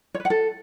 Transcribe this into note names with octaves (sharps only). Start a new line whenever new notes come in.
C#5
B4
F#5
A4